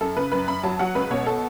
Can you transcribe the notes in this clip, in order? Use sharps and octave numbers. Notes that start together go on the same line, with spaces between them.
F#2 A4
C#3 B4
F#2 B4
F#2 B5
F#3 A5
F#3 F#5
C#2 B4
B2 C#5
A4